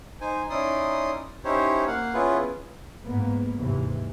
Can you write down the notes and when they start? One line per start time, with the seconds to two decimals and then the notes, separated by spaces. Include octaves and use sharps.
0.21 D#4 C5 G#5
0.50 C#4 D#4 E4 D5 C6 D#6
1.44 C#4 D#4 E4 G4 C5 C#5
1.87 A#3 F5 F#5
2.14 B3 C#4 E4 F4 G#4 B4
3.05 G#2 A#3 B3
3.56 D#2 G#2 C3 E3